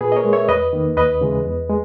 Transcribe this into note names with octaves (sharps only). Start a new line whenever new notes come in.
A#2 G#4 B4
D#5
A#4 C#5
G#3
C#5 E5
E2 B4 D#5
D#3 A#3
D#2 B4 D#5
C#3 E3 G#3
E2
G#3